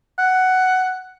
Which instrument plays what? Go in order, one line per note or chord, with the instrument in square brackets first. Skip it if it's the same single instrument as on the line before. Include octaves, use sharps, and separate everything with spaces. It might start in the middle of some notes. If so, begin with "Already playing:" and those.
[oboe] F#5